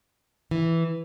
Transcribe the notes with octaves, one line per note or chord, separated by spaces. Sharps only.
E3